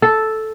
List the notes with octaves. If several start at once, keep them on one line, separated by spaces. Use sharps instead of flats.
A4